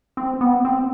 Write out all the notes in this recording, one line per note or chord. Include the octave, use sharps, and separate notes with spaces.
C4
B3
C4